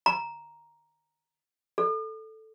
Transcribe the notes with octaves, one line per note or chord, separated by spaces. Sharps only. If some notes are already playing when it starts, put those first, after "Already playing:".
A#5
A4